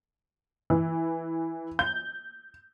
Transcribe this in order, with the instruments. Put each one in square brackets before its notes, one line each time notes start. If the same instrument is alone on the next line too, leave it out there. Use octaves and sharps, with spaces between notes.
[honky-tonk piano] E3
G6